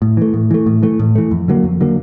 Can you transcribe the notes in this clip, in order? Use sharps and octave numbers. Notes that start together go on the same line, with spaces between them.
A2
E3 A3
A2
E3 A3
A2
E3 A3
A2
E3 A3
F2
D3 F#3 A#3
F2
D3 F#3 A#3